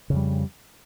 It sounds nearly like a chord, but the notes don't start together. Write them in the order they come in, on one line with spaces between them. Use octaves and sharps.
C#3 F2 G3